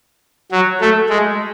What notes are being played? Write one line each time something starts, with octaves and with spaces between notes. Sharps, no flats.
F#3
A3
G#3